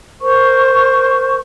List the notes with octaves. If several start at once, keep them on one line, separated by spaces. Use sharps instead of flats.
A#4 C5 C#6